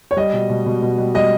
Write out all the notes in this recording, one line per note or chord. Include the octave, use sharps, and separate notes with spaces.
C#5
G3 D#5
B2
B2
B2
B2
G3
G3 D#5